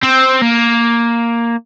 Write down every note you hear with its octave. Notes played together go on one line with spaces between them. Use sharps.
C4
A#3